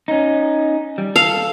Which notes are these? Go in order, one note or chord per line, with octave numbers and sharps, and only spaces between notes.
C#4 D#4
G3
A4 F5